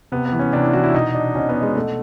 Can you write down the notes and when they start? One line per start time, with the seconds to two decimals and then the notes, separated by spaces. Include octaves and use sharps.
0.12 C3 B3
0.26 B3
0.32 E3
0.39 C#4
0.53 C3 D4
0.63 E4
0.73 E3 F#4
0.84 E4
0.94 B2 D#4
1.15 D4
1.35 B2 C#4
1.49 B3
1.62 G#3
1.76 B2 A3